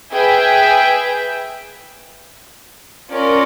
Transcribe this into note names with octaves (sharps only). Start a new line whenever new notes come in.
G#4 B4 E5 G5
C#4 F4 A#4 D5